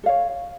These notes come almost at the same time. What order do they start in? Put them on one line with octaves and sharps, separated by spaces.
A4 F5 C#5